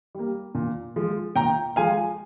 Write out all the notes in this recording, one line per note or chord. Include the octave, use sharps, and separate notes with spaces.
G3 A#3
A#2
F3 G#3
A#2 G5 A#5
F3 G#3 F5 G#5